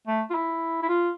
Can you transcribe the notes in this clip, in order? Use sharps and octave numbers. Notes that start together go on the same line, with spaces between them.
A3
F4
E4
E4
F4